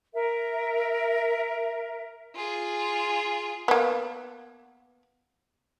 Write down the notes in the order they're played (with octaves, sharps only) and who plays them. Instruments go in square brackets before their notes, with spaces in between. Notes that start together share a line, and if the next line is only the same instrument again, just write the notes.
[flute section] A#4 E5
[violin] F4 G#4
[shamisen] A#3 B3